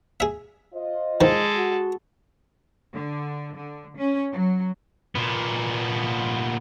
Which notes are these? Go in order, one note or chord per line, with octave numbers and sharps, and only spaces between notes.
G#4 E5
F4 C5 D#5
D#3 F3 G#3 A4
F#4
D3
D3
C#4
F#3
A#2 B3